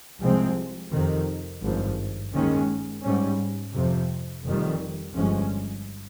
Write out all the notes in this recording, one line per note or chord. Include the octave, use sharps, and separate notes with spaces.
C2 C3 F3 G#3 C4
F2 C3 D#3
G#1 G2 F3
D#2 D#3 G#3 C#4
G#2 G3 C#4
F2 C3 F3
F1 F2 D#3 G3
G1 G2 F3 G#3 C#4